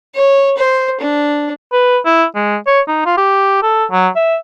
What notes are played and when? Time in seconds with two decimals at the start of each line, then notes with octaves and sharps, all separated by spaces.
0.15 C#5
0.57 C5
1.00 D4
1.73 B4
2.06 E4
2.35 G#3
2.67 C#5
2.88 D#4
3.06 F4
3.17 G4
3.63 A4
3.92 F#3
4.16 E5